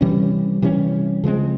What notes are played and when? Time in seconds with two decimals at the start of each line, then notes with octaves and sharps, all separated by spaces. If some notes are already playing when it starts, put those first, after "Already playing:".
0.01 C3 E3 G3 C#4
0.62 C3 E3 G3 C#4
1.24 C#3 F3 G#3 C4